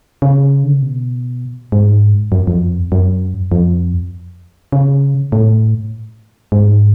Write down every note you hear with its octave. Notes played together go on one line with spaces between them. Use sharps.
C#3
D3
C#3
B2
G#2
F#2
F2
F#2
F2
C#3
A2
G#2